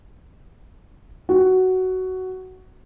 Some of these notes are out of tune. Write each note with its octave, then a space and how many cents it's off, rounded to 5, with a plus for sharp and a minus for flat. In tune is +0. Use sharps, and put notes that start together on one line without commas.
F#4 +10